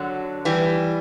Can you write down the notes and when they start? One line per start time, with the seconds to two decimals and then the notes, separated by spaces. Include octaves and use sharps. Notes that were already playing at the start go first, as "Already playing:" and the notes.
Already playing: D3 F#3
0.45 E3 G3